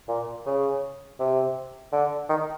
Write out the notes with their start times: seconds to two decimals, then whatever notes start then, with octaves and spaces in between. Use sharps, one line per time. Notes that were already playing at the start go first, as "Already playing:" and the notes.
0.08 A#2
0.46 C#3
1.19 C3
1.93 D3
2.29 D#3